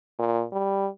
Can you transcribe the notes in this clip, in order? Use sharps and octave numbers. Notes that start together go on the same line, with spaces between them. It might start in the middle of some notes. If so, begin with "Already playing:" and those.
A#2
G3